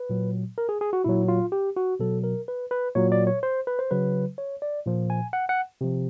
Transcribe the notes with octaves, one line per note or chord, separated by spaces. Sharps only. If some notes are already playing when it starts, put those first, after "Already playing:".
Already playing: B4
A#2 F#3
A#4
G#4
G#4
F#4
A#2 F#3 E4
F4
G4
F#4
B2 F#3 A4
A#4
B4
B4
A#2 F#3 C#5
D5
C#5
C5
B4
C5
C#3 F#3 B4
C#5
D5
A#2 F3
G#5
F#5
F#5
C3 F3